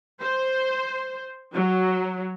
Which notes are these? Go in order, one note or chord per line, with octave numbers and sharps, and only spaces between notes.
C5
F#3